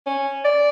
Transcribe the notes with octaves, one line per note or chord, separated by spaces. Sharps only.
C#4
D5